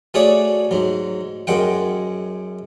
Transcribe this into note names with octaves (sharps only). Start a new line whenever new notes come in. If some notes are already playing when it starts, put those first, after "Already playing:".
A3 F#4 G#4 C#5 D5
G#2 F#3
F#2 G#3 F#5 G5